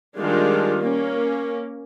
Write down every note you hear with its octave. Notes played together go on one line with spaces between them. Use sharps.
D#3 G3 G#3 D4 F4
A#3 C#4